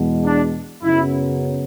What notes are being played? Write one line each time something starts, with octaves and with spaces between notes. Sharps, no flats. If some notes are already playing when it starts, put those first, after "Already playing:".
Already playing: E2 B2 G#3
D4
F#2 C#3 F#3 B3 E4